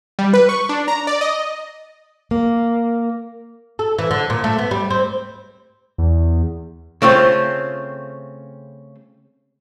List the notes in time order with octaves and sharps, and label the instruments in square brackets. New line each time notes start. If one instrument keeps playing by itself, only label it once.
[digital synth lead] G3
B4
C#6
D4
A#5
D5
D#5
[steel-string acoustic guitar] A#3
[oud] A4
E3
D3
A#2
A3
B3
G3
C4
[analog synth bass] E2
[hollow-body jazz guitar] C#3 A3 C4 F4